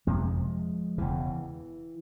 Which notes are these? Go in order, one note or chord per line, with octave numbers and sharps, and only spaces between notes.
G1 F2 C3 F3 G#3
E1 E2 C#3 E3